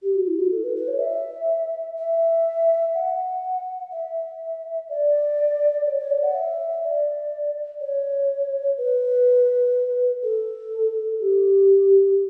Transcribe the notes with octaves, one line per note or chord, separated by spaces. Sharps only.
G4
F#4
E4
F#4
A4
B4
B4
C#5
E5
E5
F#5
E5
D5
C#5
C#5
D5
F#5
E5
D5
C#5
B4
A4
G4